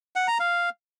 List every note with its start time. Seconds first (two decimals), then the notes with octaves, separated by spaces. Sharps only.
0.16 F#5
0.28 A#5
0.40 F5